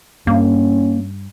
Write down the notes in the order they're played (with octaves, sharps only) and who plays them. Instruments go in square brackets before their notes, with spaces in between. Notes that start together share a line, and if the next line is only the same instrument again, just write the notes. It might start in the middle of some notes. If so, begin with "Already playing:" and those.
[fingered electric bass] G2 [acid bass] A#3 [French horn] C#4